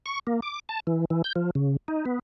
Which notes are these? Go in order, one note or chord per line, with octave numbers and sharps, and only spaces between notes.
C#6
A#3
D6
A5
E3
E3
G6
F3
C#3
D#4
B3